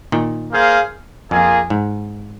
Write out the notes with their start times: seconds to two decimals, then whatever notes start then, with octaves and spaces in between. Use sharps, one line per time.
0.12 A#2 D#3
0.52 A#3 G#4 C5 F5
1.31 F2 A#3 F4 G#4
1.70 G#2